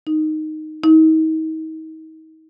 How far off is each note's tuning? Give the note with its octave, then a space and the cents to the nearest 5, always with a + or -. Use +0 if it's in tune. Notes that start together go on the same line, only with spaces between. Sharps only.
D#4 -5
D#4 +35